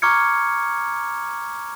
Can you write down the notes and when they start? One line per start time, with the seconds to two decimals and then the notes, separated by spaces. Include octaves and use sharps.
0.02 A#5 C#6 D6 F6 G#6 C#7